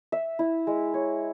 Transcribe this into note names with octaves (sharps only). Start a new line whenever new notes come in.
E5
E4
G#3
C#5